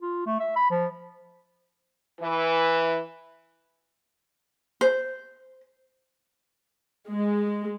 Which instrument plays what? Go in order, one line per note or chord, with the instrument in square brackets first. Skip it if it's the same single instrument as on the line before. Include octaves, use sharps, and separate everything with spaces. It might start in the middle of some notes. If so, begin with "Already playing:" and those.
[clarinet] F4
A3
E5
B5
F3
[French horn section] E3
[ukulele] C5
[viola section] G#3